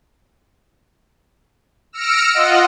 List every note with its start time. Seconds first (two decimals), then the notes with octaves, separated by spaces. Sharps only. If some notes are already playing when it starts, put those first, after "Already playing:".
1.93 E6 F6 A#6 C#7 D7
2.34 F4 D#5 F#5